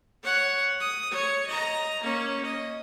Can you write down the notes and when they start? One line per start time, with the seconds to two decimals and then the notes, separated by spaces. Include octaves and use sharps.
0.23 C#5 F#5
0.80 D#6
1.11 C#5
1.47 D#5 A#5
2.02 A#3 C#4
2.45 D#5